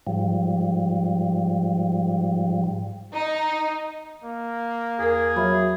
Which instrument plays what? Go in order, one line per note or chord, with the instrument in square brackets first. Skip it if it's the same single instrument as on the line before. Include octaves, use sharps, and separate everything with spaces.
[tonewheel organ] G#2 F3 G3
[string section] D#4
[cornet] A#3
[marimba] E2 A#4 [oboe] G#4
[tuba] F#3 [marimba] E5 B5